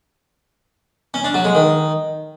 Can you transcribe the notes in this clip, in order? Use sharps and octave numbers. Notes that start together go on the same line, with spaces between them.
C#4
D4
F#3
G#3
D#3